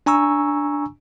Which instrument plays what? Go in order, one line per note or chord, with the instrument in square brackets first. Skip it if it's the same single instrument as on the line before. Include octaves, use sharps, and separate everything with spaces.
[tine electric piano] D4 G#5 A#5 C#6 E6